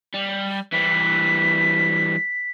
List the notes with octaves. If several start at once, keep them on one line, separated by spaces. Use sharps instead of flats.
G3
E3 G3 B6